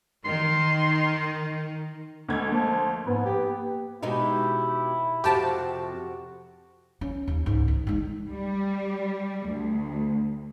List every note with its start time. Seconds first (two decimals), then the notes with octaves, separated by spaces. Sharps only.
0.25 D#3 C6
2.28 D2 G#3 G#6
2.52 F3 A#3
3.07 G#2 B3
3.25 G4
4.03 B2 G#3 D#4 E4 G4
5.24 F2 C3 F#4 G4 G5 A5
7.01 C#4
7.27 D#2
7.46 C#2 G#2
7.68 D#3
7.87 G#3 D#4
8.28 G3
9.48 D2